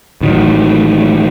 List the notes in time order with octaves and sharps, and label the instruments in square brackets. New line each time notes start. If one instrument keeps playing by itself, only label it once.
[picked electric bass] A1 D#3 F#3